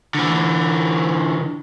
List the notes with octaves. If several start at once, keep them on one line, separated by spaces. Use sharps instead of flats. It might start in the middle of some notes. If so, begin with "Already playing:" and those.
D3 E3